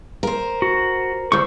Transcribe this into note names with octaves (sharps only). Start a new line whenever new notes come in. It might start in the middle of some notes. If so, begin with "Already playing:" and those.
A#4 C5
F#4
D2 D3 C5 C#6